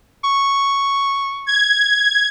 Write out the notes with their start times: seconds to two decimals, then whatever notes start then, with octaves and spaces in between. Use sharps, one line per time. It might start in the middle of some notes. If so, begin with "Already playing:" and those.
0.24 C#6
1.46 G#6